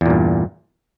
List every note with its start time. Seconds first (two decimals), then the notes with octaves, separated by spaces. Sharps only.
0.01 E2
0.06 A#2
0.10 G2